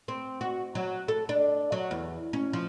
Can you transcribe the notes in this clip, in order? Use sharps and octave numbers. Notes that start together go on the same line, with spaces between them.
C4
F#4
F#3
A4
D4
F#3
E2
C#4
F3